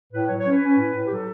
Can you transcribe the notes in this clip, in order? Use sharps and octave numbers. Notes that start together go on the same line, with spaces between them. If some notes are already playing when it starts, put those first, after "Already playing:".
A2 B4
C#5
F#3
C#5
C#4 B4
C#4
A2
A2
G4
F#3 A4